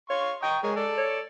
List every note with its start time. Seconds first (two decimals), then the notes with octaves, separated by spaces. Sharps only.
0.10 C#5 F5 C6 C#6
0.43 D#5 G5 A#5 C#6
0.63 G#3 G#4 A#4 C#5
0.76 A4 D5
0.98 C#5